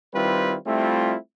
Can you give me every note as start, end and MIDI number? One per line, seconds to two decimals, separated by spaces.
0.14 0.56 51
0.14 0.56 55
0.14 0.56 60
0.14 0.56 64
0.14 0.56 65
0.14 0.56 71
0.66 1.16 55
0.66 1.16 57
0.66 1.16 60
0.66 1.16 64
0.66 1.16 65